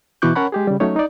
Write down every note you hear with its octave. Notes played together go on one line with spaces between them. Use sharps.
B2 E3 C#6 D6 F#6 G6
C#4 A#4 C#5 F#5 A5 B5
G#3 G4 G#4
C#3 G3
F#3 A3 C#4 D#4 C#5
D#4 D5